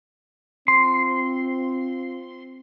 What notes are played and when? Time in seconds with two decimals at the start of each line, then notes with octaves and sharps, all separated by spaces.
0.68 C4 F4 C6